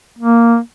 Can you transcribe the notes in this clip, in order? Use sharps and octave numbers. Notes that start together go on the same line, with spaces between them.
A#3